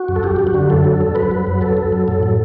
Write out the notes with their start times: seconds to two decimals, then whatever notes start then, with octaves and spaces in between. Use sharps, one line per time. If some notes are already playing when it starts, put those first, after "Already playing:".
Already playing: F#4
0.08 F#2
0.16 A4
0.23 F#2 G4
0.36 F#2 G4
0.47 F#4
0.54 D3
0.70 F#3 A4
0.84 F#2
1.01 F#2
1.15 F#2 B4
1.31 F#3
1.47 F#3
1.61 F#2 A4
1.77 F#2
1.92 F#3
2.08 A2 A4
2.23 F#3